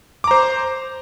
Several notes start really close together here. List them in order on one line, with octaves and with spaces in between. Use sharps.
D6 A#5 C5